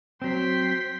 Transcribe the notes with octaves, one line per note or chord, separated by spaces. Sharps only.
F#3 C4 G5 C6 B6